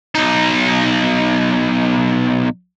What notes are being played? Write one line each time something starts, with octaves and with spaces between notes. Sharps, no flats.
B1 D#4